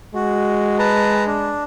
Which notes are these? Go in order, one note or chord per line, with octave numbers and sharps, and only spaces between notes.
G#3 F#4
B4 A5 A#5
D4